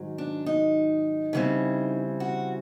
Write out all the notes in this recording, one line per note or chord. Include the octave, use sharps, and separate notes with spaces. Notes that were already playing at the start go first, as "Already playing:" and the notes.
Already playing: G#2 D#3 F#3
D4
D#4
C#3 E3 G3 C4
F#4